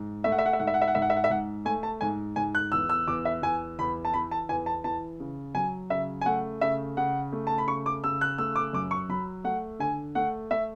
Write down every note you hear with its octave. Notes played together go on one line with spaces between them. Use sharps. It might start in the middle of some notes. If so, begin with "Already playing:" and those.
Already playing: G#2
A3 E5
F#5
E5
F#5
E5
G#2 F#5
E5
F#5
E5
F#5
G#2 E5
F#5
E5
F#5
E5
G#2 F#5
A3 G#5
A5
G#2 G#5
G#2 G#5
F#6
E2 E6
E6
E2 D6
E5
E2 G#5
E2 B5
A5
E3 B5
A5
E2 G#5
A5
E3 A5
C#3
F#3 G#5
C#3 E5
G#5
A3 F#5
C#3 E5
C#3 F#5
A3
A5
B5
C#3 C#6
D6
C#3 E6
F#6
A3 E6
D6
F#2 D6
C#6
F#3 B5
A3 F#5
D3 G#5
A3 F#5
A3 E5